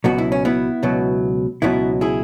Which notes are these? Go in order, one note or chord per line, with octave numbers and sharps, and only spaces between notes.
C#2 B2 F#3 F#4
E4
C#4
B3 E4
C#2 B2 F#3
C#2 B2 F#3 B3 E4
E4 G#4